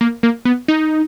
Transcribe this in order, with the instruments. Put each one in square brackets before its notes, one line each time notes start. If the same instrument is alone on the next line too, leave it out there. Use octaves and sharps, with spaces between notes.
[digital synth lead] A#3
A#3
B3
D#4